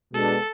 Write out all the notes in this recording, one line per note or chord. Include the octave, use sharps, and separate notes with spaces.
B2 G#3 B3 D4 A4